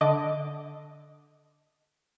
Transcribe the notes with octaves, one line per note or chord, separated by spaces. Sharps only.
D3 D#5 D6